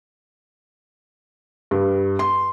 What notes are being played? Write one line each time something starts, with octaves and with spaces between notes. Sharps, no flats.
G2
C6